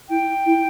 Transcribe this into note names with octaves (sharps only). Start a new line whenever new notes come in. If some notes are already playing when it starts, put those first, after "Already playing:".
E4 G5
E4